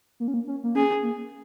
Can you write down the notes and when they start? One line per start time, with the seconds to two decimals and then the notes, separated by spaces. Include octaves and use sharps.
0.20 A#3
0.28 C#4
0.34 A#3
0.47 C#4
0.64 A#3
0.75 C#4 G#4
1.03 A#3